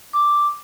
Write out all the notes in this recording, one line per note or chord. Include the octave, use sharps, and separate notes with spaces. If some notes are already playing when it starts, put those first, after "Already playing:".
D6